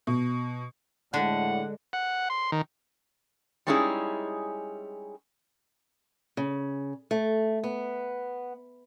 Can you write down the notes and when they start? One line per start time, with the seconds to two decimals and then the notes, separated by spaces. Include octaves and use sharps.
0.07 B2
1.14 A2 D3 G#3 F#5
1.93 F#5
2.30 C6
2.52 D#3
3.67 G3 G#3 C#4 D#4 E4 G#4
6.37 C#3
7.11 A3
7.64 B3